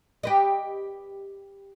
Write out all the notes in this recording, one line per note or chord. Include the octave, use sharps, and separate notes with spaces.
G4 B4 D#5